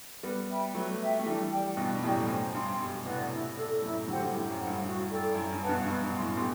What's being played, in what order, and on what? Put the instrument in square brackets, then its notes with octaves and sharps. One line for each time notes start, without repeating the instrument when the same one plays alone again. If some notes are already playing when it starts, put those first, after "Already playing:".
[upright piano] G3 B3 [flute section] B4
[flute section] E5 G5 B5
[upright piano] F#3 A3 [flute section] B4
[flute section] E5 G5
[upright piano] A3
[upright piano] E3 G3 [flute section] D4
[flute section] G4 D5 G5
[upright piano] G2 B2 [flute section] D4
[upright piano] G2
[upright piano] F#2 A2 [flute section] G4 D5 G5
[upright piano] F#2 [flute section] C5
[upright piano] G2 [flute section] G5 C6
[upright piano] G2 B2 [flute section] G4
[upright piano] A2 C3 [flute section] B4 D5 F#5
[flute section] E4
A4 D5
[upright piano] F#2 A2 [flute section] E4
[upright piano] D3 F#3 [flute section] G4 C5 F#5
[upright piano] G2
[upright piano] F#2 A2 [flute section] G4
[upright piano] F#2
[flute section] C5 F#5
[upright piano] G2
[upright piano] G2 [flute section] F#4
[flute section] A4 D5 G5
[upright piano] F#2 [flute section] E4
[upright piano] G2
[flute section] B4 F#5 A5
[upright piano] G2 B2
[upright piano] G2 B2 [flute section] B4
[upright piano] G2
[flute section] F#5
[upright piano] F#2 A2 [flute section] C6
[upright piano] B2 [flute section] G4